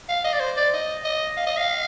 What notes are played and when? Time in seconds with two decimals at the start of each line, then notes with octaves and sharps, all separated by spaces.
0.09 F5
0.24 D#5
0.33 D5
0.40 C5
0.57 D5
0.73 D#5
1.05 D#5
1.37 F5
1.46 D#5
1.57 F5